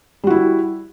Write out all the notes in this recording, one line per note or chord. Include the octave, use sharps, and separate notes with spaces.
G3 E4 F#4